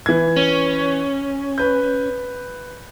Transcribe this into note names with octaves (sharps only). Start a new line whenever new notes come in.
E3 G#6
C#4
B4 G6